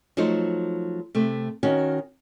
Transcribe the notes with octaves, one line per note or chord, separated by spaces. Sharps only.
F3 F#3 A3 D#4 C5
C3 A3
D#3 C#4 F#4